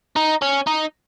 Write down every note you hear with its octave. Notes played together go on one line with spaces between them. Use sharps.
D#4
C#4
D#4